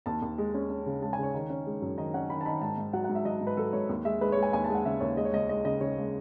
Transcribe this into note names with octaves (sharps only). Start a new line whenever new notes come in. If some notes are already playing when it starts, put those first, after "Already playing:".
D#2 A5
D#2
G#3
C#4
C#4
C#3
G#3 A5
G#5
C#3 C#5
D#3
C#4
G#3
F#2
D#3 D#5
C#4 F#5
D#3 B5
A5
D#3 B5
G#2 A5
G#2
F#3 F#5
G#2 F#5
E5
F#3 D#5
G#2
B4
F#3 A4
G#2 C#5
D#2
G#3 E5
G#3 B4
G#3 C#5
G#5
D#2 G#5
G#3 A5
F#5
C#3 E5
D#2 C#5
G#3 D#5
C#5
C#2 D#5
G#3 D#5
C#3 D#5
C#3 C#5
G#3